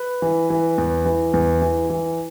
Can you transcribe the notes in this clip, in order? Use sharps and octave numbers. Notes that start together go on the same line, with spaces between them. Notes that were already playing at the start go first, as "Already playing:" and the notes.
Already playing: B4
E3
E3
E2
E3
E2
E3
E3